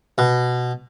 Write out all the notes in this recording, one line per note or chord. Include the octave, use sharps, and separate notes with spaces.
B2